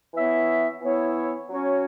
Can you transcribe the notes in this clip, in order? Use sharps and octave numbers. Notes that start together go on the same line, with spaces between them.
E3 B3 E4 C#5 E5
E3 B3 E4 C#5 E5
F#3 C#4 F#4 C#5